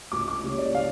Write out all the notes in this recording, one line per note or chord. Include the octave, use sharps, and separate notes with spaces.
C#2 D6
D6
C#3 G3 A#3 C#5
D5
F5